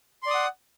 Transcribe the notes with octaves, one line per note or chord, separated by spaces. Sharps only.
D5 F#5 C6 D#6